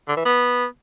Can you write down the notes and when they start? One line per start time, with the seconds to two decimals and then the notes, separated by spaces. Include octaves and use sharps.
0.08 D3
0.17 E3
0.25 B3